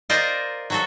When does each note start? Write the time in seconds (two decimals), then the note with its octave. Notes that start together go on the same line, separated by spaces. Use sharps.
0.10 F4 A#4 C5 D5 D#5
0.70 F#3 F#4 A4